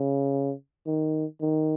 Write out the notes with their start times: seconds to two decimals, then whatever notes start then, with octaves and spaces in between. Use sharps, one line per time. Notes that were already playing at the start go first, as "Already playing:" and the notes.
Already playing: C#3
0.87 D#3
1.42 D#3